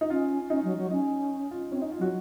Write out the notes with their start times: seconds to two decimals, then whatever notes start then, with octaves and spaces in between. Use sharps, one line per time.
0.01 D#4
0.10 C#4 F4
0.50 C#4 D#4
0.64 F#3
0.77 F#3
0.91 C#4 D#4
1.51 F4
1.71 C4 C#4
1.82 D#4
1.92 F4
1.99 F#3 F#4